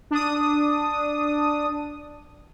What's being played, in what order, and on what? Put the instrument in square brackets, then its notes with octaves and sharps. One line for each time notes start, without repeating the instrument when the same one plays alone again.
[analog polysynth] D4 D#6